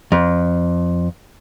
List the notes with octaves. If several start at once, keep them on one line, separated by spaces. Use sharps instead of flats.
F2